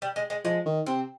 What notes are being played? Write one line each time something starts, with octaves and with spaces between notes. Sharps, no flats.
G3
G#3
G#3
F3 G#3
D#3
C3 C4